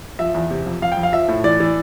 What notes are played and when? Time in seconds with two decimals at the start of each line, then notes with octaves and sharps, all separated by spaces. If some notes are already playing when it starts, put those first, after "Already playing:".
0.19 F3 E5
0.34 E2
0.50 C3
0.66 F2
0.82 F2 F5
0.92 G5
0.97 F2
1.03 F5
1.12 F3 E5
1.28 A2
1.44 E3 D5
1.60 E3